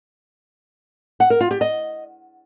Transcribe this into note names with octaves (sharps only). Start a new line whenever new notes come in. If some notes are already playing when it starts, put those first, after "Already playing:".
F#5
A#4
F4
G4
D#5